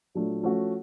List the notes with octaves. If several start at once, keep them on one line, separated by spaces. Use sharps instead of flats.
A#2 F#3 A3 D4
F3 A3 C#4 F#4